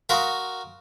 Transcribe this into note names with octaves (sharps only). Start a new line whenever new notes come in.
F#4 A#4 F5 C6 D#6